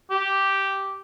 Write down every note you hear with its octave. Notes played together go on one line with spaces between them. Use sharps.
G4